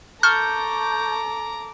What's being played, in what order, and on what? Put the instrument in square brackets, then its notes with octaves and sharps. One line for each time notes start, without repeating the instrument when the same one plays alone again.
[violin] A4 D6 [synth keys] A5 C#6 G6 [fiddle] A#5 [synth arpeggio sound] F6